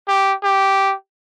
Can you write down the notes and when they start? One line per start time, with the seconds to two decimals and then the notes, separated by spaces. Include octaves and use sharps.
0.08 G4
0.44 G4